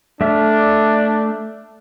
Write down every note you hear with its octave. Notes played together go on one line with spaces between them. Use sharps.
A3 D4 E5 F6